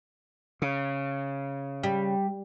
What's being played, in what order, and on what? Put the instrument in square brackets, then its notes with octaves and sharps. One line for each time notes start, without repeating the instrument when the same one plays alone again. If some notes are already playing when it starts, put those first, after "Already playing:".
[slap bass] C#3
[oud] G3